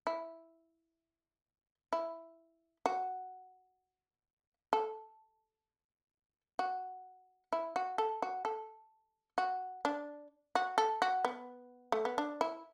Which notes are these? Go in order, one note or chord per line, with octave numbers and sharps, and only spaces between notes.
E4
E4
F#4
A4
F#4
E4
F#4
A4
F#4
A4
F#4
D4
F#4
A4
F#4
B3
A3
B3
D4
E4